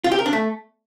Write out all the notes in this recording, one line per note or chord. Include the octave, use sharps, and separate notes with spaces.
F4
G4
A#4
D4
A3